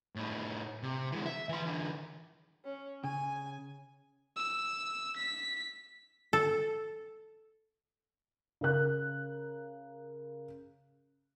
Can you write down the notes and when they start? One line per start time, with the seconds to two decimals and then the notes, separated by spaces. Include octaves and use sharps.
0.15 A2 D#4
0.83 C3
1.12 E3 G#3
1.26 E5
1.49 E3 C6
1.66 D3 E3
2.64 C#4
3.04 C#3 G#5
4.36 E6
5.17 B6
6.33 A4
8.61 C#3 A#4 F#6